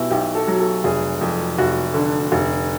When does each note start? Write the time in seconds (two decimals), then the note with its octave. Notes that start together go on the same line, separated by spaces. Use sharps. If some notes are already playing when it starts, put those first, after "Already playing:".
Already playing: B1 B2 E4 F#4 G4
0.10 B1 G4
0.35 A4
0.48 F#3
0.60 A4
0.84 F1 G#4
1.21 F2
1.58 F1 F#4
1.94 D3
2.32 F1